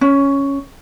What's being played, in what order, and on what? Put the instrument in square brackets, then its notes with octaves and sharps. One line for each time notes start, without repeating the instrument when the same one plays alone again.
[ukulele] C#4